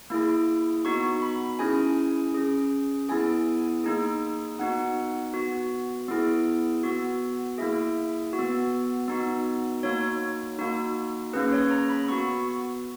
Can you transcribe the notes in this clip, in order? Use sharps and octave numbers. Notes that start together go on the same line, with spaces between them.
A#3 E4 G#4
B3 D#4 F#4 C#6
B5
C#4 E4 G#4 G#5
C#4 G#4
B3 E4 G#4 G#5
A#3 D#4 G#4
B3 D#4 F#4 F#5
B3 F#4
B3 E4 G#4
B3 F#4
A#3 E4 G#4 E5
F#4
B3
B3 D#4 F#4
A#3 D#4 F#4 C#5
A#3 D#4 F#4
A#3 C#4 G#4 B4
C#5
A#5
B5
B3 F#4 C#6